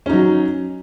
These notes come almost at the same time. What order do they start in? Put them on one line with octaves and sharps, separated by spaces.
C#4 D#4 F#3